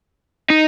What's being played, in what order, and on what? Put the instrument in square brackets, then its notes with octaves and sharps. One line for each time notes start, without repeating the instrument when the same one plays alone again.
[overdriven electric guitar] D#4